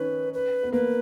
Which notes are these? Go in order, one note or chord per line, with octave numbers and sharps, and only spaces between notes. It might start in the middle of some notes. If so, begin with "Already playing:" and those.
Already playing: D#3 C#4 B4
B4
B3
A#3 B4